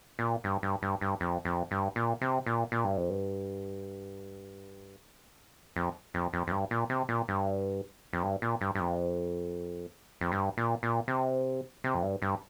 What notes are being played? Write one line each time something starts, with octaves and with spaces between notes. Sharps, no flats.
A#2
G2
G2
G2
G2
F2
F2
G2
A#2
C3
A#2
A#2
G2
F2
G2
F2
F2
F2
F2
G2
A#2
C3
A#2
G2
F2
G2
A#2
G2
G2
F2
F2
G2
A#2
A#2
C3
C3
F2
G2
G2